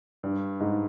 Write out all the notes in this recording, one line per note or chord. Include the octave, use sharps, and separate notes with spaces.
G2
G#2